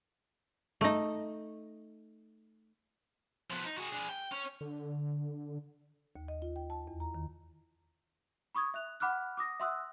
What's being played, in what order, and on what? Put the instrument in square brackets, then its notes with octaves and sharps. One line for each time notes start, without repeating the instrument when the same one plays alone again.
[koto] A3 D#4
[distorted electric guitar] F3 B3
D#4
F#4 G#4
D4 G#4
G5
C#4
[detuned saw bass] D3
[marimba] D#2
D#5
F4
G5
A5
E2
A#5
D#3
[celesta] B5 C#6 D#6 G#6
E5 F#6 F7
F#5 B5 D6 F6 F#6
D6 D#6 A#6
E5 F#5 C6 D#6 E6 F#6